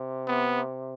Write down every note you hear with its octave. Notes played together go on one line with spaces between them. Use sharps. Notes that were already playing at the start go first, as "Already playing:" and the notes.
Already playing: C3
B3